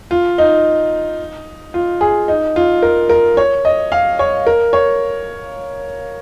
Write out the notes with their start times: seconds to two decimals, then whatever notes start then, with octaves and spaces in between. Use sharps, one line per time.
0.11 F4
0.38 D#4
1.74 F4
2.01 G#4
2.28 D#4
2.56 F4
2.82 A#4
3.09 A#4
3.37 C#5
3.65 D#5
3.92 F5
4.19 C#5
4.47 A#4
4.73 C#5